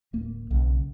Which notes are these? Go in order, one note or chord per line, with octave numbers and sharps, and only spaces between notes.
D1 A#3
B1 C#3